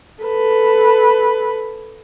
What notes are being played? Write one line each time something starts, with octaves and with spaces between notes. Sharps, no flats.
A4 B4